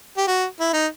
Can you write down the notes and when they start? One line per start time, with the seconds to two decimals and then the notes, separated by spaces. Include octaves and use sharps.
0.17 G4
0.27 F#4
0.60 E4
0.73 D#4